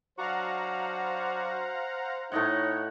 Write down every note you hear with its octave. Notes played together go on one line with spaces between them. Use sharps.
F#3 D4 F#4 C5 F5 F#5 A#5
A2 D#4 C#5 D#5 F#5